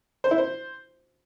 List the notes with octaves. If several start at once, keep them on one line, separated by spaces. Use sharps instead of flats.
C5
E4
C5